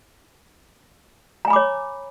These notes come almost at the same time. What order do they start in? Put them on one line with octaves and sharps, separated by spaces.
A#5 G#5 B5 D6 C#5